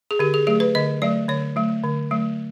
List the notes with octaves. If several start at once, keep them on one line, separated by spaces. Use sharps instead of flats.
G#4
D3 G4
G#4
F#3 A3 G#4
B4
D3 D#5
F#3 A3 D5
D3 C#5
F#3 A3
D3
F#3 A3